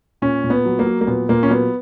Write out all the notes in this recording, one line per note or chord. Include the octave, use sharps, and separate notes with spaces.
A#2 C#4
A#2
B3
F#3
A#3
F#3
A#3
A#2 B3
A#2 A#3
C#4
F#3 B3